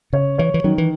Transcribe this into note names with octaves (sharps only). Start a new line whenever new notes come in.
C#3 C#5
E3 C#5
E3
D#3 F#3
E3